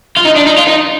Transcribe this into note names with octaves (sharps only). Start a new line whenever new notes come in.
F4
D#4
D4
D#4
F4
D#4